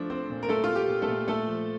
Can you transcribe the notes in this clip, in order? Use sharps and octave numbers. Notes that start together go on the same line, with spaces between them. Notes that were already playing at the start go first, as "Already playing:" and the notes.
Already playing: F3 A3 D4
C4 C5
A#2
A#4
A3 C4 A4
F4
A3
G4
A#2
A3 A4
A#2
A3 A4
F3